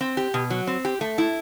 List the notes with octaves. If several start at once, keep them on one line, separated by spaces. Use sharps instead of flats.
C4
G4
B2
F#3
C4
G4
A3
E4